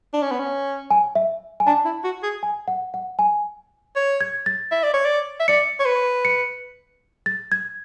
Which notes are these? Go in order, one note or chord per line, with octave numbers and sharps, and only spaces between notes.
D4
C#4
B3
C#4
G#5
E5
G#5
D4 A5
E4
F#4
G#4
G#5
F#5
F#5
G#5
C#5
G#6
A6
E5
D5
C#5
D5
E5
D5 C#7
C#5
B4
C#7
A6
G#6